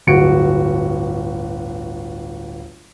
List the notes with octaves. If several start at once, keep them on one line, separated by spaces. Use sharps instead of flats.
D1 G1 F#4 C#7 D7